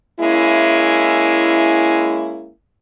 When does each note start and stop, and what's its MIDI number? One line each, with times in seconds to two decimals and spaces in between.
0.20 2.50 56
0.20 2.50 58
0.20 2.50 61
0.20 2.50 64